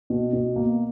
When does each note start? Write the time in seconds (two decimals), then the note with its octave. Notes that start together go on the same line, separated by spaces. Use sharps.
0.10 B2
0.33 B2
0.56 A#3